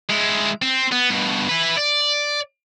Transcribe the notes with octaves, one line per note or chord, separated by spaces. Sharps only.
G#3 E4
C4
B3
G2 B2
E4 B4
D5